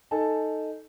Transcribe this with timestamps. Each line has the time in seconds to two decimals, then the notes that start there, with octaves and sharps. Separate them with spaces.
0.11 D#4 A4 G#5 A5